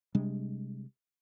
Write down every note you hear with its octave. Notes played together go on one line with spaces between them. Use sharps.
C3 G3 G#3 D4